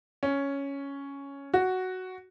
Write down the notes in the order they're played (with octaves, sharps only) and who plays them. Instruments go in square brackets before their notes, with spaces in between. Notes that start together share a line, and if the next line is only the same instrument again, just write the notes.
[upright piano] C#4
F#4